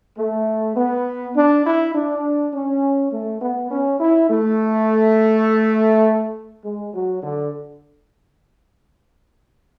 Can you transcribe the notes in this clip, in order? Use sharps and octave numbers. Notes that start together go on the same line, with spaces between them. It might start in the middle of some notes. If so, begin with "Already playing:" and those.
A3
B3
D4
E4
D4
C#4
A3
B3
C#4
E4
A3
G#3
F#3
D3